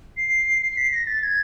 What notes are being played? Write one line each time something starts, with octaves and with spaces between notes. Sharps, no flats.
C7
C7
B6
A#6
A6
G#6